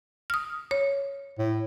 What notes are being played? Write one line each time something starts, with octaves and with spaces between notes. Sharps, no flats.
D#6 F6
C#5
A2